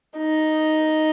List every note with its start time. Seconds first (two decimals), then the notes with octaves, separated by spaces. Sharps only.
0.18 D#4